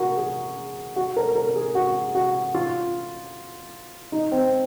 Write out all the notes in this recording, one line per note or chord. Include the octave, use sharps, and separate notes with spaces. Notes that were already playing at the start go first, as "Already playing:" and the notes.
Already playing: F#4 A#4
G#4
F#4
A#4
A#4
G#4
F#4
F#4
F4
D#4
C4